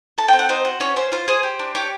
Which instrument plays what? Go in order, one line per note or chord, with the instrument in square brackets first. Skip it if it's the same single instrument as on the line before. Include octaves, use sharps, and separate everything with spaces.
[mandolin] A4 A5
G5
C4
F#5
D#4 C5
F#4
C#4 C#5
C#4 C5
F4 C5
G#4 C5
G4
D4
G4 C#5